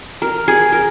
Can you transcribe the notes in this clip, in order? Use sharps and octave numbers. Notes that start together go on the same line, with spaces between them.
A#4
G#4
A#4